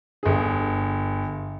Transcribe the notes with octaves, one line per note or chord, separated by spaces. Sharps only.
G1 G#4